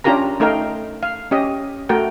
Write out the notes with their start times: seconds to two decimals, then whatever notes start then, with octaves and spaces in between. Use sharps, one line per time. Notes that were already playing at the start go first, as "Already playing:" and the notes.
0.04 C#4 D4 F4 G4 A#4 A#5
0.40 A3 D#4 A#4 F5 G5
1.03 F5
1.31 C#4 G4 D#5
1.89 A3 F#4 A#4 G5